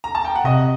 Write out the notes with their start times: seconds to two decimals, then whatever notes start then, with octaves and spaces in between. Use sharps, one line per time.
0.04 A#5
0.15 A5
0.25 G5
0.35 F#5
0.44 C3 D#5